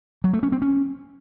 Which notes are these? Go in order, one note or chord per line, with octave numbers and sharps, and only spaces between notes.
F#3
A3
C#4
C4
C#4